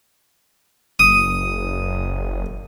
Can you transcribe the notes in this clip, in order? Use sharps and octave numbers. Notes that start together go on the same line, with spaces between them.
F#1 D#6